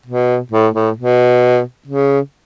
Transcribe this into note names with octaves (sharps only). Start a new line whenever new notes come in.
B2
A2
A2
B2
C#3